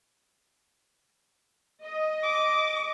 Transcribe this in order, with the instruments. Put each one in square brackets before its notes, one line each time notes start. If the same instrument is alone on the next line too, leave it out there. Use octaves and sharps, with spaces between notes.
[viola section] D#5
[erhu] D6